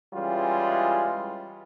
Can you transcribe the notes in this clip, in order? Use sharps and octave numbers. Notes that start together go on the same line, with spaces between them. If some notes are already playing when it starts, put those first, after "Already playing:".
E3 G3 G#3 C#4 E4 F4